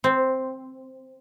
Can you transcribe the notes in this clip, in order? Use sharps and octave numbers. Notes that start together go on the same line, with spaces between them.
C4